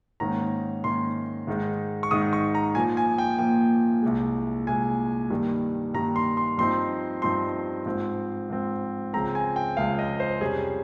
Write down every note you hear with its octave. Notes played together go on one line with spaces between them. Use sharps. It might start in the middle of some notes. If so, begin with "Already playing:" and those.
G#2 D#3 A#3 C#4 A#5
G#2 D#3 A#3 C#4 C6
G#2 D#3 G#3 D#4
C#6
G#2 D#3 G#3 D#4 D#6
C#6
A#5
A#2 F3 A#3 G#5
G#5
G5
A#2 F3 A#3 G5
C2 A#2 G#3
C2 A#2 G#3 G#5
G2 D#3 G3 A#3
G2 D#3 G3 A#3 A#5
C6
C6
G2 F3 C4 D#4 C6
G2 F3 C4 D#4 C6
G#2 F3 C4
G#2 F3 C4
C#2 C#3 F3 G#3 C4 A#5
G#5
G5
C#2 C#3 F3 G#3 C4 F5
D#5
C5
F2 C3 G3 C#4 G#4